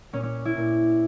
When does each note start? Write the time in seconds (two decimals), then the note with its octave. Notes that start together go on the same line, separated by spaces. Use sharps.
0.13 A#2 C#4
0.23 C#4
0.45 E4
0.57 A#2